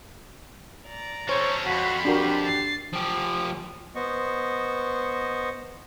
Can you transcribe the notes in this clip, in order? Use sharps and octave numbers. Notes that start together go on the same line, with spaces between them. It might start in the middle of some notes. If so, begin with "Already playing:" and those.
D5 A#5
C#4 A4 C5 C#5
F2 F#4 B5 C6
D4 F#4 G4 A#4
A6 C7
F3 G4
B3 C5 D#5 C#6